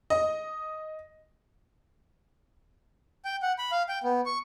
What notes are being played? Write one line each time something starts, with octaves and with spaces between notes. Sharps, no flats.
D#5
G5
F#5
B5
F5
G5
B3
C#6